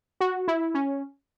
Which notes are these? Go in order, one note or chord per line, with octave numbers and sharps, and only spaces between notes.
F#4
E4
C#4